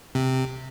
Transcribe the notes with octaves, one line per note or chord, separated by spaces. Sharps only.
C3